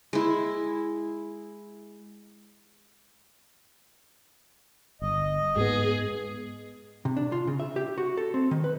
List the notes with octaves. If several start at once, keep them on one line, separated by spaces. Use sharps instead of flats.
G#3 E4
G1 D#5
G#2 B3 G#4
C3
D4
F4
C#3
E5
G4
F#4
A4
C4
D#3
B4